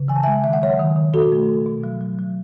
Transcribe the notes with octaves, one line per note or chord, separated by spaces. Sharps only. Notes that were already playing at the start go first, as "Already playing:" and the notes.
Already playing: C#3
E3 G#5
A5
G#3 E5 G#5
D#3 E5
F#5
F#3 C#5 E5
D#3
D#3
B2 F#4 A4
A3
B2
B2
F#3
F#3
F#3